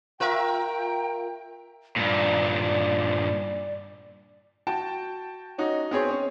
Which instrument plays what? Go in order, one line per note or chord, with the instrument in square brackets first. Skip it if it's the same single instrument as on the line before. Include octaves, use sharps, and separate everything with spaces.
[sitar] F4 A#4 E5 [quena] G5
[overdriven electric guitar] G2 A#2 [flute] D5
[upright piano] F#4 G5 A5
C#4 D#4 F#4
B3 C4 G#4 C#5
C#4